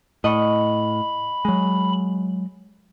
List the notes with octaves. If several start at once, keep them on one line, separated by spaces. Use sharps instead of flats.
A2 D#5 B5 C#6
F#3 G#3